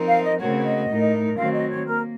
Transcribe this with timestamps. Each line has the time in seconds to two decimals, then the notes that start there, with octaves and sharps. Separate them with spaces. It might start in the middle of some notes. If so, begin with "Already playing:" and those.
Already playing: F3 C4 D#4 A#4
0.08 F5
0.24 D#5
0.40 C#3 A3 C4 F#4 A#4 C#5
0.57 C#5
0.65 D#5
0.89 A2 A3 D#4 A#4
1.37 D#3 F#3 A3 C4 F5
1.54 D#5
1.70 C#5
1.86 A#3 A#4